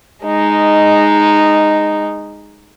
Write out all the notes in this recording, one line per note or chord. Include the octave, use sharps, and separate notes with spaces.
G#3 D#4